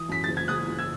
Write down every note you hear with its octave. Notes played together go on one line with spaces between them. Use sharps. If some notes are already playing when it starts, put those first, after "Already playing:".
Already playing: E3 D#6
F#2 B6
F#1 A6
G#6
F#1 D#6 F#6
F#1
E6 G#6